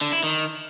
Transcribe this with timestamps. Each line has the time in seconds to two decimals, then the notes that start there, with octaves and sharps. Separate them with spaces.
0.01 D3
0.12 E4
0.23 D#3